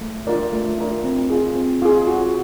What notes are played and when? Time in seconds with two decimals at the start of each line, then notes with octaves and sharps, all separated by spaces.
0.01 A3
0.27 D4 F4 A#4 D5
0.53 A3
0.78 D4 F4 A#4 D5
1.04 C4
1.30 F4 G#4
1.55 C4
1.82 F4 G#4
2.07 F#4